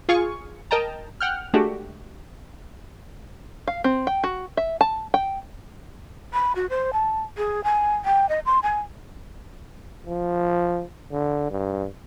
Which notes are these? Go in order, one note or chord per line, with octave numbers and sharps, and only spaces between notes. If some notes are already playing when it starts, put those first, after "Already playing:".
F4 G#4 F5 G#5 C#6
A#4 D#5 G5 A5 A#5
F#5 G5 F6
G#3 A3 D4 F#4 G4
F5
C4
G5
F#4
E5
A5
G5
B5
F#4
C5
A5
G#4
G#5
G5
D#5
C6
G#5
F3
D3
G2